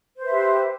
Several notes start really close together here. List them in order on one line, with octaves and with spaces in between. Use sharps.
C5 B4 E5 G4